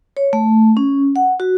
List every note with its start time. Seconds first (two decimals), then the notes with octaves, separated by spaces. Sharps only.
0.17 C#5
0.33 A3
0.77 C#4
1.16 F#5
1.40 F#4